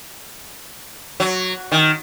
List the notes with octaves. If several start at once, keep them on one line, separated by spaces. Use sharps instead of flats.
F#3
D#3